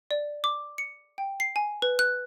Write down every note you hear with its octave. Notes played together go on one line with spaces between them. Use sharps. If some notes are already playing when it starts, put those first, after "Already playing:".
D5
D6
C#7
G5
C7
G#5
B4
F#6